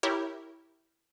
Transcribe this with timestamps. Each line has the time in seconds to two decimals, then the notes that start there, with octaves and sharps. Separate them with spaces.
0.03 E4 G4 A#4 C#5